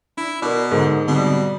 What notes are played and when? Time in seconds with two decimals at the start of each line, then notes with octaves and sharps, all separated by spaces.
0.17 D4 E4
0.42 B2 A#4 D5
0.71 G#2 D3 A#4
1.07 B2 D3 G3 G#3 C4